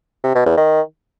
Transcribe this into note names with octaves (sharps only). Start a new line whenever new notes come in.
C3
B2
E2
D#3